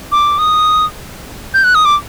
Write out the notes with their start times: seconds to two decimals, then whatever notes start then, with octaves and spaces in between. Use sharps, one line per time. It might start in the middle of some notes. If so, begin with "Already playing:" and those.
0.12 D6
0.38 D#6
1.54 G6
1.64 F#6
1.75 D#6
1.85 D6